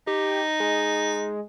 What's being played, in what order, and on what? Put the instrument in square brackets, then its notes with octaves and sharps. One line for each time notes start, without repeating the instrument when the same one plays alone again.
[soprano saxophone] D#4 [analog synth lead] G4
[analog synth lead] G#3